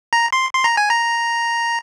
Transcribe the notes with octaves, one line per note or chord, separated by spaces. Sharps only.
A#5
C6
C6
A#5
G#5
A#5